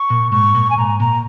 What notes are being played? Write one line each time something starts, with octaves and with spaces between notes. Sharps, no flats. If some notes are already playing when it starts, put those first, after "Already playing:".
Already playing: C#6
A#2
G#2 C#6
A#2
G#5
G#2 A#5
A#2 A#5